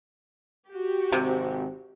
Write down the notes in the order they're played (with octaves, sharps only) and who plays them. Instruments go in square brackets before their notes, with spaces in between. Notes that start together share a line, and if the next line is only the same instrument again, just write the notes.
[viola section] F#4 G4
[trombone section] G#1 C4 [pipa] C3